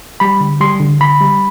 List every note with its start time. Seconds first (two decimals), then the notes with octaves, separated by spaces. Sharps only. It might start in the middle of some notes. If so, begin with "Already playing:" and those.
0.20 G3 B5
0.40 D3
0.61 G3 C6
0.80 D3
1.00 D3 B5
1.21 G3